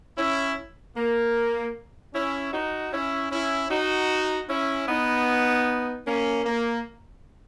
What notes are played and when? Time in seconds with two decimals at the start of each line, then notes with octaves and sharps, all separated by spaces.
0.17 C#4 E4
0.96 A#3
2.13 C#4 E4
2.52 D#4 F#4
2.92 C#4 E4
3.30 C#4 E4
3.70 D#4 F#4
4.48 C#4 E4
4.87 B3 D#4
6.05 A#3 C#4
6.44 A#3